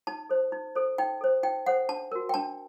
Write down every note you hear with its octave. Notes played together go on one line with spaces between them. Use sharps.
D#4 A5
A4 C5
D#4
A4 C5
D#4 G5
A4 C5
D#4 G5
A4 C5 F#5
D4 A5
F#4 A#4
G5
D4 A5